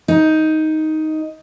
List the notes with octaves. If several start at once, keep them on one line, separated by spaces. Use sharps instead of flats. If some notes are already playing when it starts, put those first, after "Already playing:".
D#4